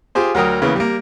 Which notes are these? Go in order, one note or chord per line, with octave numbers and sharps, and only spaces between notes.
F4 G4 G#4 C5
D2 F#3 A#4 G5 D#6
C#3 E3 A#3 B3
G3 A#3